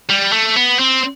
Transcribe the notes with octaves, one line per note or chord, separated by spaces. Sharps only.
G3
A3
B3
C4